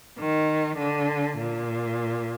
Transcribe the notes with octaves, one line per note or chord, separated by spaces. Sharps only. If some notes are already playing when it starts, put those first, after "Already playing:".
D#3
D3
A#2